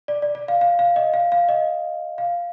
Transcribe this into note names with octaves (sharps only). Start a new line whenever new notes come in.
D5
D5
D5
F5
F5
F5
D#5
F5
F5
D#5
F5